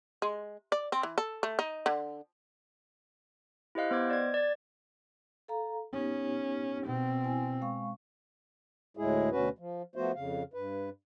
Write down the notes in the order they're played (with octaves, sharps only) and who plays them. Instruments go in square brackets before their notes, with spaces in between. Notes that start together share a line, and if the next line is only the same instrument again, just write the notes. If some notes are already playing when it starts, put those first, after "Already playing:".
[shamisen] G#3
D5
C4
E3
A4
A3
D#4
D3
[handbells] E4 G4 C5 D#5 F5 F#6
B3 C5 D#5 D6 G#6
D5 G#6
D5 A6
[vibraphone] A4 F5 A#5
[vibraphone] B3 D#4 G4 [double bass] C#4
[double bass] B2 C4
[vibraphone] E4 G#5
G#3 F5 C#6
[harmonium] D2 A2 G#3 E4 G#4
D2 B2 C#4 F#4 B4
F3
F3 A3 B3 F#4 C5
F2 C#3 F5
G2 B4